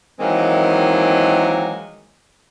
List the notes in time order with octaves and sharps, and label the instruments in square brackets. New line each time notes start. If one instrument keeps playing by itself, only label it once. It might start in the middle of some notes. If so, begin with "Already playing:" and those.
[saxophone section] D#3 E3 F#3 G#3 A#3 C4